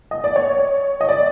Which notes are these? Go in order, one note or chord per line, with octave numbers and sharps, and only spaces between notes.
D#5
D5
C#5
D#5
D5